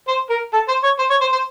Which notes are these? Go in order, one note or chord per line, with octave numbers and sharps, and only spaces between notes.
C5
A#4
A4
C5
C#5
C5
C#5
C5
C5